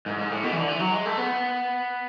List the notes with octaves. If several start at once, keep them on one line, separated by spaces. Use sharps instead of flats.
G#2
G#2
A2
B2
E3
D3
E3
F#3
G#3
A3
B3